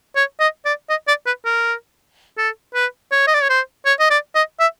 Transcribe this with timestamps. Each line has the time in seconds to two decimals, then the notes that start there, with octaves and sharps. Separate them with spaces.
0.16 C#5
0.40 D#5
0.65 D5
0.89 D#5
1.08 D5
1.26 B4
1.45 A#4
2.38 A4
2.74 B4
3.12 C#5
3.27 D#5
3.34 D5
3.42 C#5
3.49 C5
3.86 C#5
4.00 D#5
4.10 D5
4.35 D#5
4.60 E5